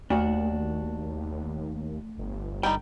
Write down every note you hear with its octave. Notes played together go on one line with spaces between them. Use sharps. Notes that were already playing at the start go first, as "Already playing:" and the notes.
D#2 A3 D4 F#4
G1
G3 D#4 G5